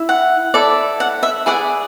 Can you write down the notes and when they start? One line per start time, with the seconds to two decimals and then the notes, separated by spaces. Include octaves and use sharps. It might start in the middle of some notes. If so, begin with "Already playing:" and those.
Already playing: E4
0.09 F#5
0.54 E4 A4 D5
1.00 F#5
1.23 E5
1.46 E4 G#4 D5 F#5